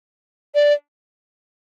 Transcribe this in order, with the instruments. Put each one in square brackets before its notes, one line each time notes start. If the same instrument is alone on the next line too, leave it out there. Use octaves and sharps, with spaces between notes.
[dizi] D5